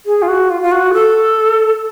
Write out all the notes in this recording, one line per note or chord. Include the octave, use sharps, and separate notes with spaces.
G#4
F4
F#4
F4
F4
F#4
A4